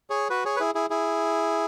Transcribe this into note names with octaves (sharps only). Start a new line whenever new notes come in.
G#4 C#5
F#4 B4
G#4 C#5
B4
E4 G#4
E4 G#4
E4 G#4